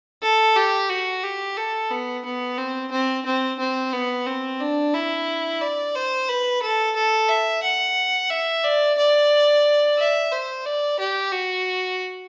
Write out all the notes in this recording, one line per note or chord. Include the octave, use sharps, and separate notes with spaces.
A4
G4
F#4
G4
A4
B3
B3
C4
C4
C4
C4
B3
C4
D4
E4
D5
C5
B4
A4
A4
E5
F#5
E5
D5
D5
E5
C5
D5
G4
F#4